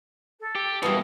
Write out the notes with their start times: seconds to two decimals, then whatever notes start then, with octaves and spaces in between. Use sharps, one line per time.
0.40 A4
0.55 G4
0.83 B2 E3 G3 A#3 D#6